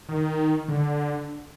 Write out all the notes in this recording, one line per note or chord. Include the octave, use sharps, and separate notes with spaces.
D#3
D3